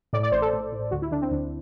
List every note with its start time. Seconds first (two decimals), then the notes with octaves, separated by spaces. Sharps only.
0.13 A2 D5
0.23 D5
0.32 A1 C5
0.42 A4
0.53 A2
0.72 A2
0.91 D2 F#4
1.02 E4
1.11 D3 D4
1.22 C4
1.31 D2 D4